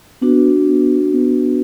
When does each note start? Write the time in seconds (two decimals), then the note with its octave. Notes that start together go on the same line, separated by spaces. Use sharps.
0.22 B3 D4 F#4
0.68 B3
1.14 B3